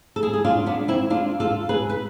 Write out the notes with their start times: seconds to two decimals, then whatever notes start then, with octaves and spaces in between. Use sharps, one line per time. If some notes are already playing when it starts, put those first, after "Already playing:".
0.16 A4
0.22 E4 G#4
0.33 G#4
0.45 D4 F4
0.66 B3 D4
0.88 C4 E4
1.10 D4 F4
1.40 F4 A4
1.69 G#4 B4
1.90 B4